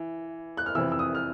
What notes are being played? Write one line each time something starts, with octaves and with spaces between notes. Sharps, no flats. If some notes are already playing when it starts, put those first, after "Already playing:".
Already playing: E3
F#6
F6
F2 C3 E3 E6
E6
D#6
F6